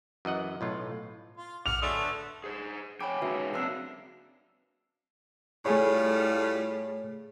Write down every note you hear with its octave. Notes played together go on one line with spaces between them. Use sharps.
F#2 E3 D#5 F#5
B1 A2 F4
F4
A#1 F#5 D6 F6 C#7 F7
D3 F#3 G#3 A3 D5 D#6 E6 A6
B3
G#4 C5
F2 C#5 G5 G#5 B5 D6
C#3 G#3 D#4 F#4 B4 E5
F#2 A#3 C4 D4 E6 C7
A2 G3 A3 F4 G#4 C#5